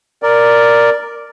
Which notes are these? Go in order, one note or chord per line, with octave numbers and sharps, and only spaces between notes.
A#4 D5